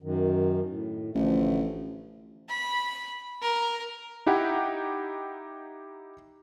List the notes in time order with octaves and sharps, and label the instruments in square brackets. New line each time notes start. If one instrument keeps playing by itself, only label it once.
[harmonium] F#2 D#3
A2
[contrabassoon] A1 [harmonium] D3 F3 A3
[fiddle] B5
A#4
[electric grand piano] D#4 E4 G4 F#5 G5